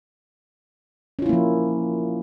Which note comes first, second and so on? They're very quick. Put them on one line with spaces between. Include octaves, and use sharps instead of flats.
C#4 F4 E4 A#3 F3